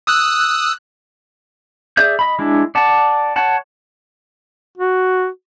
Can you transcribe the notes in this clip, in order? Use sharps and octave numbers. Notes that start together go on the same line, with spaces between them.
D#6 E6 F#6
G#4 D5 E5 G6
D#5 B5
G#3 D4 E4
D5 F#5 A5
C#5 F#5 A5
F#4